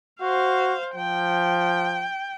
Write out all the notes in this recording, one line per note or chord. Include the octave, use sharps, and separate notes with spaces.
F#4 C5 F5
F3 G5